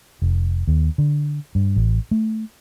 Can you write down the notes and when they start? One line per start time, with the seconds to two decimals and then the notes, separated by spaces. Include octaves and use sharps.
0.22 F1
0.67 D#2
0.98 D3
1.55 G2
1.76 A1
2.11 A3